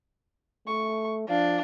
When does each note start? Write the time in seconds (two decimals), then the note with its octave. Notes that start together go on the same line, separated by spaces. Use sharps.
0.67 A3 C#6
1.29 F3 D4 F5